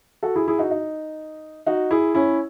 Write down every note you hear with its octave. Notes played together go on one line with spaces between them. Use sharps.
F#4 A4
E4 G#4
E4 G#4
D#4 F#4
D#4
D#4 F#4
E4 G#4
C#4 E4